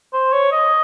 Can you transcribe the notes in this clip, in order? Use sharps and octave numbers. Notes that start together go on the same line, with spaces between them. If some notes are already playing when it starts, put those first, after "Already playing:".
C5
C#5
D#5